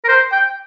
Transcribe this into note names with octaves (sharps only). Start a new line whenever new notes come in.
A#4
C5
G5